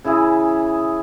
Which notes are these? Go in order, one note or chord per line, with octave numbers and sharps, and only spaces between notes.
C#3 E3 E4 G#4